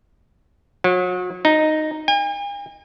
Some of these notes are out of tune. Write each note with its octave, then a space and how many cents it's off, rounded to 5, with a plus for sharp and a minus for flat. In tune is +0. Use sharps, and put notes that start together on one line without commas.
F#3 -35
D#4 -5
G#5 -45